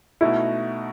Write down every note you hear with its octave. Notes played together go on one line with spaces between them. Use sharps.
B2 A3 D#4 E4 F#4